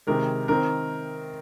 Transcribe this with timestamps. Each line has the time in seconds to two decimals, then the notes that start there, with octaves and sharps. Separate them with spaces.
0.07 C3 D#3 G#3 A#4
0.48 D#3 C4 A#4